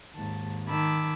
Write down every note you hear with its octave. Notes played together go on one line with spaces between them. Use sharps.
D#2 G#2 A5
D#3 A5 B5 D6 E6 G#6